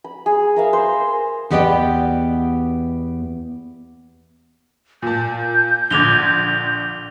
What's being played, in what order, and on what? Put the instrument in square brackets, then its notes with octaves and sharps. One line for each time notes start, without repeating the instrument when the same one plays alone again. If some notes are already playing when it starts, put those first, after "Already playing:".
[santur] B5
G#4
A#4 E5 F5
C5
[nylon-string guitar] E2 B3 G4 D5 D#5 G5
[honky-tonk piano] A#2 A5 [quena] G6
[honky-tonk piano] A#1 D3 G#6 [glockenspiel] D6 F7 G7